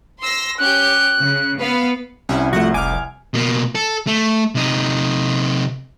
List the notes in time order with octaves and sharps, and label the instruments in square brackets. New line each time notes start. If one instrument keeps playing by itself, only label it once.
[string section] C6 E6 A#6
[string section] C#4 G4 G6 [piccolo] F#6
[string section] C#3
B3 B4 F5
[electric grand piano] C2 C3 [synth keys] C#4 E4
[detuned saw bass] F3 [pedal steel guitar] A3 F#4 [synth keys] F#5
[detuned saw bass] F1 [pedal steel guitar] G#5 F6 [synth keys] D6
[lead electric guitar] B2 A#3
A4
A3
C3 D#4